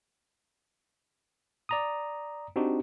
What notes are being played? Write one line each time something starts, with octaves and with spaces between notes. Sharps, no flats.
D5 A#5 D#6
C4 D4 D#4 F#4 G4